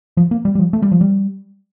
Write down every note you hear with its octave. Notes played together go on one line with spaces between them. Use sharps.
F3
A#3
G3
G3
F3
A3
G3
F3
G3